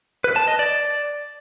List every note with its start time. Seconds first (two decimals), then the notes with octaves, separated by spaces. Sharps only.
0.24 B4
0.36 A5
0.48 D#5
0.59 D5